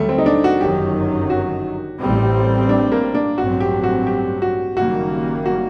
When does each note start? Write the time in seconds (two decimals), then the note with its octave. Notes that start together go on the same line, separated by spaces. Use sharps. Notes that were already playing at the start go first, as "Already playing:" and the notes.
Already playing: D#2 D3 F#3 G3 A3
0.09 C4
0.18 D#4
0.26 D4
0.44 F#4
0.61 G1 F#2 D#3 F#3 G4
1.30 F#4
2.00 A1 A2 G3 C4
2.69 D4
2.92 A#3
3.15 D4
3.38 A1 G2 F#3 C4 F#4
3.60 G4
3.84 F#4
4.07 G4
4.42 F#4
4.76 F#1 F#2 D#3 G3 A#3 F#4
5.46 F#4